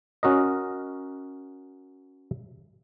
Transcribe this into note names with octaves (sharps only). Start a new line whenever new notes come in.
C#4 F#4 A#4 D#5